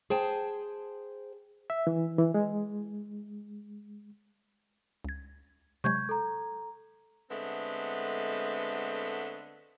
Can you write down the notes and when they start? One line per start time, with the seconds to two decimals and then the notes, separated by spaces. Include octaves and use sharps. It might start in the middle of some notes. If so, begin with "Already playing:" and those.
0.10 G#4 C5 G5 A5
1.70 E5
1.87 E3
2.18 E3
2.34 G#3
5.04 C#2 G#6
5.84 C3 F#3 G#3 C#6 G6 G#6
6.09 A4 A#5
7.30 D3 G#3 A3 B3 C4